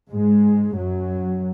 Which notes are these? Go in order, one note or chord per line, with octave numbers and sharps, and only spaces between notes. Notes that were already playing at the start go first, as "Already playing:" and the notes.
G#2 G#3
F#2 F#3